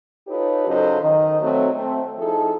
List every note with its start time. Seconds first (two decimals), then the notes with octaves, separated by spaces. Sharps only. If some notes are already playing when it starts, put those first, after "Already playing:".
0.27 D#4 F4 G4 A4 B4 C#5
0.67 F#2 C#3 D#4 A4 C5 D#5
1.01 D#3 D#5
1.41 F#3 A3 C4
1.74 A3 C4
2.18 F3 D#4 E4 G#4 A4